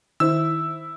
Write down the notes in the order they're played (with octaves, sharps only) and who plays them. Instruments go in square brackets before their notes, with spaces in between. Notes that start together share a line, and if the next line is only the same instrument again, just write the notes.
[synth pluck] D#3 C5 [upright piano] E4 [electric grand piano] E6